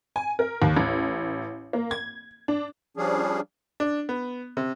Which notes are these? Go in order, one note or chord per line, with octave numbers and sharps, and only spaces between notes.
G#5
A#4
D#2
A1
A#3
G#6
D4
F3 G3 C#4 D4 G#4
D4
B3
C3